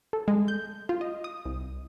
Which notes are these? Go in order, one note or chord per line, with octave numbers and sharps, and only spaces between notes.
A4
G#3
G6
F4
D#5
D#6
C2